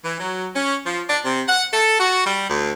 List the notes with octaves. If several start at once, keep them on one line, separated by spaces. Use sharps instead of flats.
E3
F#3
C#4
F3
D4
C3
F#5
A4
F#4
G3
D2